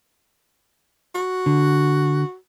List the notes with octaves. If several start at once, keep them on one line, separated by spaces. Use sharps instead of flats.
F#4
D3